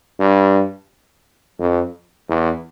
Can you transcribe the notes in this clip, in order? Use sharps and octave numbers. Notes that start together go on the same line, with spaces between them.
G2
F2
E2